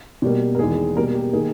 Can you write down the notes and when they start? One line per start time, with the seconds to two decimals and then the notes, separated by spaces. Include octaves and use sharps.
0.22 B2 G3 A#3
0.55 A#4
0.59 E2 D#3 G#3 G#4
0.96 B2 G3 A#3 A#4
1.14 G4
1.33 D#3 A#3 G#4